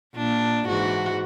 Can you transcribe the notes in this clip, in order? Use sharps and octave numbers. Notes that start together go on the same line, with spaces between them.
A#2 D4
G#2 E3 F#4